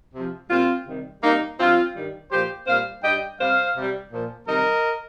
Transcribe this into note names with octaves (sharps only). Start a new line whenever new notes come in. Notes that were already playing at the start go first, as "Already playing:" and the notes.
C3 F3
A#2 G3 C4 F4
C3 D#3 G3
C3 G3 A#3 D#4
G2 F3 C4 F4
G2 D#3 G3
A#2 F3 G4 C5
A#2 G3 C5 F5
G2 G3 D#5 G5
C3 G3 C5 F5
C3 G3
A#2 F3
C3 D#3 G3 A#4 D#5